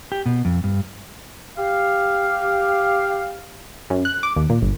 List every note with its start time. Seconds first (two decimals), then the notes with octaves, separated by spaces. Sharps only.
0.12 G4
0.26 B2
0.45 F2
0.64 G2
1.57 G4 F5
3.90 F#2
4.05 F#6
4.23 D6
4.36 D#2
4.50 A#2
4.62 G1